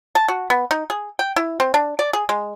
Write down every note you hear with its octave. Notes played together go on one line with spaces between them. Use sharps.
A5
F#4
B3
D#4
G#4
G5
E4
C4
D4
D5
G#4
G#3